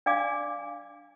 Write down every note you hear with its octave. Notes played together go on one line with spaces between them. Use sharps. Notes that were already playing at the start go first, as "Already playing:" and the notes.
D4 D5 F5 G#5 D6